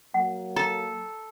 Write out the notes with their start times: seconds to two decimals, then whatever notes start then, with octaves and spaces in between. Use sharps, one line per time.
0.14 F#3 A#3 F#5
0.56 A4 A#5